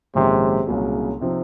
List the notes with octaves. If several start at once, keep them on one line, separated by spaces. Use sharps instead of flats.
A#1 G#2 C3 D#3 G#3 C#4
C2 A#2 C#3 F#3
C3 F3 C4 D#4